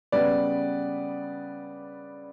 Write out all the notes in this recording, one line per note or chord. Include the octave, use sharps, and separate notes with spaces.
C#3 G3 B3 B4 D5